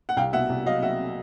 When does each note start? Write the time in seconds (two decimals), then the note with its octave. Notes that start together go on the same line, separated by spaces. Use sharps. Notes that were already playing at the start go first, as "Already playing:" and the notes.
0.09 F#5
0.17 C2 F5 G5
0.33 B2 E5 F#5
0.49 C2
0.66 F#3 D#5 F5
0.82 F#3 E5 F#5